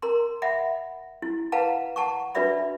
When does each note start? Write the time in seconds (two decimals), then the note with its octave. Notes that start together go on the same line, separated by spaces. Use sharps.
0.02 A#4 A#5 C6
0.42 E5 F#5 B5
1.22 E4
1.52 B4 F5 F#5 A5 A#5
1.96 F#5 A5 A#5 C#6
2.35 D4 F#4 B4 D5 E5 B5